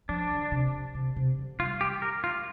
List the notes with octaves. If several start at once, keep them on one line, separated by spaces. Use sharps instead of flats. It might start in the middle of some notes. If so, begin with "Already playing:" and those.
F3 D4
D3
C3
C3
C3
D3
G3 F4
G4
A#4
F4